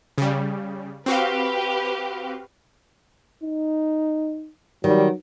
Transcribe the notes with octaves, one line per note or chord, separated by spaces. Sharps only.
C#3 G3
C4 F#4 G4 B4 F5
D#4
D#3 F#3 G3